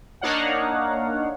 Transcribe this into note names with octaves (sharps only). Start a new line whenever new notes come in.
A#3 D4 D#4 C#5 F5 F#5